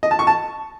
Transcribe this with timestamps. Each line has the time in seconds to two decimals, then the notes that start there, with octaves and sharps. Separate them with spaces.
0.03 D#5
0.11 A5
0.19 C#6
0.27 A5